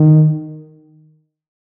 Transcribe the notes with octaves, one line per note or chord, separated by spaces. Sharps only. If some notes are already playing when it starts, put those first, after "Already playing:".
Already playing: D#3